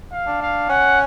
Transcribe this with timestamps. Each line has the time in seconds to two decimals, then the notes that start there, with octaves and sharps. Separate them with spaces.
0.12 F5
0.27 D4
0.42 F5
0.69 C#4 F#5